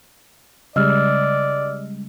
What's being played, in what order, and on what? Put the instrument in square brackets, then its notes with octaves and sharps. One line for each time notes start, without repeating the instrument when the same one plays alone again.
[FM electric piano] C#3 G3 G#3 [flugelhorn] D5 [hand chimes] D#5 E6 F6